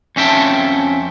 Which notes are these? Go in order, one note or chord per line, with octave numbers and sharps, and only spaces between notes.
F2 C#4 E5 G5 A5